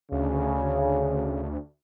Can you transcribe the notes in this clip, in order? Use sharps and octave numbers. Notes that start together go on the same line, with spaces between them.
D2 C#3